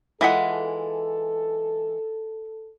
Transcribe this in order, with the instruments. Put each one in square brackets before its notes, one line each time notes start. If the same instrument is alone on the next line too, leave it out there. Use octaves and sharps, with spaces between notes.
[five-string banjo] E3 G#3 [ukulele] F4 E5 F#5 [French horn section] A4